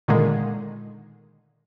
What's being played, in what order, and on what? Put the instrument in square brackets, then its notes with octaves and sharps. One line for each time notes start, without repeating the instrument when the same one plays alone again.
[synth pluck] A#2 D3 D#3 G#3